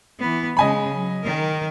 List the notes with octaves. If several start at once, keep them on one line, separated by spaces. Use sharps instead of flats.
E3 B3
C#3 G#3 D#5 G#5 B5
F#3
D#3 A#4